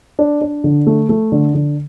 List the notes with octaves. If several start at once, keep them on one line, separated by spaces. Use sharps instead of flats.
D4
D4
D3
A3
A3
D3
D3